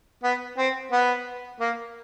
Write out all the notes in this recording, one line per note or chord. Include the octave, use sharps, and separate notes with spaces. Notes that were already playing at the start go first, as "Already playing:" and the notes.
B3
C4
B3
A#3